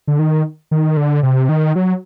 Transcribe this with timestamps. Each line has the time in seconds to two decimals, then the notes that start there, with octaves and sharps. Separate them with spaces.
0.07 D3
0.19 D#3
0.71 D#3
0.97 D3
1.23 C3
1.49 D#3
1.76 F#3